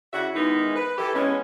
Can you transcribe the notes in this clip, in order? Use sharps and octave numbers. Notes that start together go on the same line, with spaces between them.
C#3 E4 F#4 D5 E5 F#5
D#3 E3 G#3 B3 D#4 E4
B4
E3 G4 A4
E3 G#3 B3 C#4